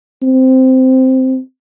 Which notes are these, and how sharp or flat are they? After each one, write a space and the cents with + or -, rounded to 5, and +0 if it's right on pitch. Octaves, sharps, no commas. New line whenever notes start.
C4 -5